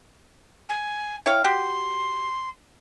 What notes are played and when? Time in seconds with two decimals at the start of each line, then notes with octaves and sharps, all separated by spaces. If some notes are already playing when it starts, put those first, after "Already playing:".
0.69 G#5
1.26 E4 C#5 F5 G5
1.44 F#4 G4 C6